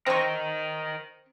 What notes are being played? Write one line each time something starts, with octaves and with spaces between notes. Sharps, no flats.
C4 A#4 D#5 C6 C#6